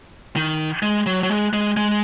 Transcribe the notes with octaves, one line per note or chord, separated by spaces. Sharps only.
D#3
G#3
F#3
F#3
G#3
G#3
G#3